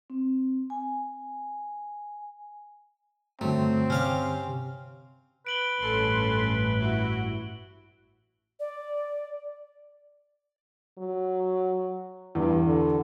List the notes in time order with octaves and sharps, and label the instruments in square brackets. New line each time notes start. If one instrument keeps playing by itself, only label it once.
[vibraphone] C4
G#5
[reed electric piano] G2 D3 [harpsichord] F#3 [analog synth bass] A3 [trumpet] C4
[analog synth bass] C3 [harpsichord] C#4 F5 D6
[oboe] B4 [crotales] D7 F#7 G7
[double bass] A1 G2 [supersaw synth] C#4 A4 C6
[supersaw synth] E4 F#4
[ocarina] D5
[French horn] F#3
[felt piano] E2 [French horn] G2
[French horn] D3